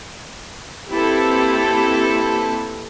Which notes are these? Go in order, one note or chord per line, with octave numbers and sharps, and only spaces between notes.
A#3 C4 E4 G4 A4 B4